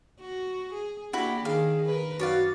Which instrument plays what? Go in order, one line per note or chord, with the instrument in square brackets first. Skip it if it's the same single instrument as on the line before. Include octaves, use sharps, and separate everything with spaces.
[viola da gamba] F#4
G#4
[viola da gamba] A#3 D4 G4 [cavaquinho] E4 F#4
[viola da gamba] D#3 [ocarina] G#4 [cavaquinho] F5
[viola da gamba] A#4 B4
[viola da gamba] F#2 D#4 [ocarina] F#4 [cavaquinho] C#5 D5 F5